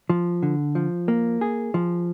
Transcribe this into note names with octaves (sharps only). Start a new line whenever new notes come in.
F3
D3
F3
A#3
G#4
F3